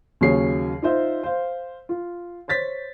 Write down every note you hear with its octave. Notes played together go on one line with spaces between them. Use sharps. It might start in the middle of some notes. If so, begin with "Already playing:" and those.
D#2 C#3 F#3 G#4 C#5 C7
D#4 F4 C5 E5
C5 F5
F4
C5 C#5 A6 B6